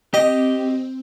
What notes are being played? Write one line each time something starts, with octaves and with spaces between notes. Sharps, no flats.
C4 G4 D#5 G5